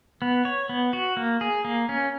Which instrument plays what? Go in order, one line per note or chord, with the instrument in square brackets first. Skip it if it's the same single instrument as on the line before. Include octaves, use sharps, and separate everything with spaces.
[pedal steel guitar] B3
C#5
B3
F#4
A#3
G#4
A#3
C#4